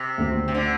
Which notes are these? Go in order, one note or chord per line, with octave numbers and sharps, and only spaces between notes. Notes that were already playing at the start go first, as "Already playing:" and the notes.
Already playing: C3
D2 D3 A3
C3
D3